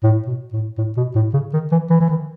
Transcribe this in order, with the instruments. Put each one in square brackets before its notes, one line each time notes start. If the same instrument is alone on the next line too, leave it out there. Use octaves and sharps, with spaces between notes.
[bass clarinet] A2
B2
A2
A2
B2
A2
C#3
D#3
E3
E3
E3
D#3